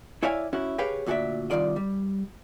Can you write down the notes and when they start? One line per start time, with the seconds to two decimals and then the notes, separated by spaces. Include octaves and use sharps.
0.23 E4 C#5 D5 E5 F5 G#5
0.53 C#4 E4 F#4
0.78 G4 G#4 B4 C#5 F5 G5
1.06 D2 A#2 F#4 G#4 D5 E5
1.50 C2 A#2 D#3 F4 D5 D#5
1.76 G3